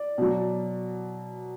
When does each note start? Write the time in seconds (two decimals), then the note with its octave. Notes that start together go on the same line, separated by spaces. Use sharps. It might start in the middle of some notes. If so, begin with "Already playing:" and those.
Already playing: D5
0.18 B2 F#3